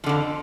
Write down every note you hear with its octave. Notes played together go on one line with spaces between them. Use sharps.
F2 D3 F3